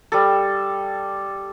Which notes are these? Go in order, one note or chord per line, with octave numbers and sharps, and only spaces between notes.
G3 A4